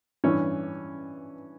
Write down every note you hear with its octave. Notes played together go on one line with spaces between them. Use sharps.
G2 E3 C#4